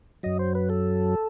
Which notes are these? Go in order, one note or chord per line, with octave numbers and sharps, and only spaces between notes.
F#2 F#3 D#5
C5
B4
A4